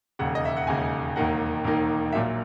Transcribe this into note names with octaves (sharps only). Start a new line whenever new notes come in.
E1 D#2 C#3 F#5
D#5
E5
F#5
E1 D#2 C#3 G#5
E1 D#2 D#3 A#3 D#4 F#5
E1 D#2 D#3 A#3 D#4
A#1 A#2 F#3 A#3 E5